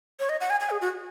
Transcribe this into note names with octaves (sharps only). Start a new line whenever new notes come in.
C#5
D#5
F#5
G#5
G#5
G#4
F#4